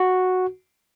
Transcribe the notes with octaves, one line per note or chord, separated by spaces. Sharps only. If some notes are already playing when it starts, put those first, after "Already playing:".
Already playing: F#4